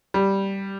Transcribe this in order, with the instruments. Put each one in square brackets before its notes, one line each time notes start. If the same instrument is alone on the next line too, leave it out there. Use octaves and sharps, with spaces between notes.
[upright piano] G3